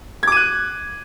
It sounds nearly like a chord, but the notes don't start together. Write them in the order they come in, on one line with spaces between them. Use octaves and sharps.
G#6 D6 D#7 F#6